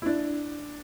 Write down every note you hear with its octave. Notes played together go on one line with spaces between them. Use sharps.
E4
D4